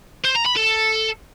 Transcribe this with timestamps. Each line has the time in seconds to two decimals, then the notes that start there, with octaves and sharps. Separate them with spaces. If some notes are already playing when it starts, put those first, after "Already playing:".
0.25 C5
0.36 A#5
0.46 B5
0.57 A4